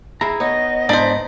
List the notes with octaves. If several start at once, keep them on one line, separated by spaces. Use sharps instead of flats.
E4 G#4 A#5
B3 D#4 C#5 D#5
G#2 B3 D4 D#4 C5